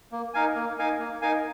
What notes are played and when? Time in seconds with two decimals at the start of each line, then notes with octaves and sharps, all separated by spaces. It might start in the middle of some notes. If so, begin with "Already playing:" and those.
0.12 A#3
0.34 D#4 A#4 F5 G#5
0.55 A#3
0.78 D#4 A#4 F5 G#5
1.00 A#3
1.22 D#4 A#4 F5 G#5